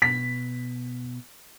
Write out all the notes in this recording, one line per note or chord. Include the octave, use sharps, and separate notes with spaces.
B2 B6